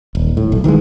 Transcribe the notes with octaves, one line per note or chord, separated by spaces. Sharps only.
D#1
A2
B1
D#3 E3 F#3 G#3